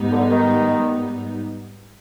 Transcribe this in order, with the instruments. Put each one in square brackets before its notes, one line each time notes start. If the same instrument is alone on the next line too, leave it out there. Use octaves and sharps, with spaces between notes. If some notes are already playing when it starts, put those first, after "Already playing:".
Already playing: [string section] G#2 G3 B3 D#4
[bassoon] D3
D#3